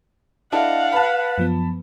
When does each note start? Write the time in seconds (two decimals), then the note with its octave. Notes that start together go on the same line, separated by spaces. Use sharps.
0.52 D4 E4 A4 D#5 F5 F#5
0.92 B4 A5 B5
1.38 F#2 F3 B3